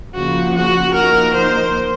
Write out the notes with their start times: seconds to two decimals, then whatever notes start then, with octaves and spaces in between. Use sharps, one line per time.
0.14 C#3 F3 A#3 F#4
0.55 F#4
0.93 F3 A#3 D#4 A#4
1.34 C5